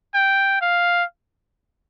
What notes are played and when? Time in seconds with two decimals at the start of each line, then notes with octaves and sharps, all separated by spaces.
0.14 G5
0.61 F5